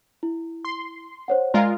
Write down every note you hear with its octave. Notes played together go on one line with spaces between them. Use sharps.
E4
C6
C5 C#5 F#5
G#3 F4 A#4 D5 F5 A#5